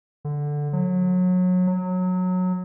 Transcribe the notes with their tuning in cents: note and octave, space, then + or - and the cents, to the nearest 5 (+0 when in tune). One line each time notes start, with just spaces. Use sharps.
D3 +0
F#3 -25
F#3 -15